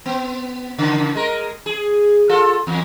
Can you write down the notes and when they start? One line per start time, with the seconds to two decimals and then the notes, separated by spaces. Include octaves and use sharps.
0.06 B3
0.79 C#3
1.15 G#3 A#4
1.66 G#4
2.29 F4 A4
2.67 E2